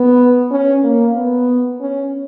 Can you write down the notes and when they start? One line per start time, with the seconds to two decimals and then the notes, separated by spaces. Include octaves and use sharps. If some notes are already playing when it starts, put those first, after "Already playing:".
Already playing: B3
0.52 C#4
0.84 A#3
1.16 B3
1.81 C#4